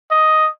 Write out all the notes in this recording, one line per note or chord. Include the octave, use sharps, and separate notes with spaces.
D#5